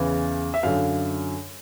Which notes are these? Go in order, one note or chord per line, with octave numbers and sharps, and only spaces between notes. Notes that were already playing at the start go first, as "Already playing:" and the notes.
Already playing: E2 C#3 E3
E5
F#2 D3 F5